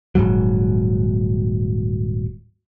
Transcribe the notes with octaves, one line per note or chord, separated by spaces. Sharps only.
D#1 E2 G#2 F#3